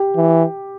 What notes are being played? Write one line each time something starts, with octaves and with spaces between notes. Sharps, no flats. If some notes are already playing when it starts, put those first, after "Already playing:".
Already playing: G4
E3